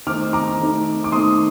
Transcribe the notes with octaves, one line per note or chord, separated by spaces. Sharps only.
D#3 A3 C4 D#4 D6 F6
A#5 D6
D#3 A3 C4 D#4
D6
D#3 A3 C4 D#4 C6 D#6